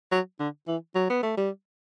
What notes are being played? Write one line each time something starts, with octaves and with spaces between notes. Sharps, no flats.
F#3
D3
E3
F#3
B3
A3
G3